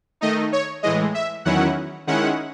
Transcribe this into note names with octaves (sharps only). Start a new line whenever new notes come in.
D#3 A3 D#4 D#5
C#5
A2 E3 G#3 D#5
E5
E2 D#3 F#3 C#4 E4 F#5
D#3 G#3 C#4 E4 F#5